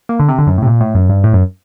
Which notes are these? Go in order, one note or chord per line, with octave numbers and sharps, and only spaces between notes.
A#3
D3
C3
D3
F#2
A2 C3
A#2
A2
F#2
G2
A2
F#2